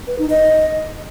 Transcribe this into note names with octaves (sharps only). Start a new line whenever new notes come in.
B4
D#4
D#5